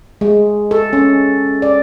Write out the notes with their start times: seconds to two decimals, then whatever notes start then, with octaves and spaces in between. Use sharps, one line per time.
0.21 G#3
0.71 A4
0.93 C#4
1.62 D5